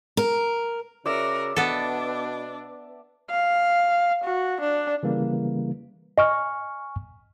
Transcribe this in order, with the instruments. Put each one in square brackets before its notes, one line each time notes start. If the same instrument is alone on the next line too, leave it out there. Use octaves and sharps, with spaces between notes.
[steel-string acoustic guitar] A#4
[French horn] C#3 [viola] F#4 A#4 [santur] D5 E5
[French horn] B2 [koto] B3 A4 [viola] D4
[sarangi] F5
F#4
D4
[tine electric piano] C#3 E3 G3 A#3
[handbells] D#5 [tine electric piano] G#5 C#6 F6